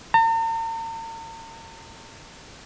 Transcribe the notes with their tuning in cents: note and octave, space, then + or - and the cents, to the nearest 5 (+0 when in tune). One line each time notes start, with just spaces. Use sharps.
A#5 -45